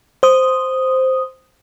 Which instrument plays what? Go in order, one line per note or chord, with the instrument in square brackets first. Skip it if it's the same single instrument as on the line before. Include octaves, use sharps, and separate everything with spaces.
[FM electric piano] C5 D#6